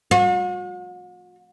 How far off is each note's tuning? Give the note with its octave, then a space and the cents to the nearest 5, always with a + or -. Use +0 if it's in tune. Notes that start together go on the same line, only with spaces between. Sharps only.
F#4 -45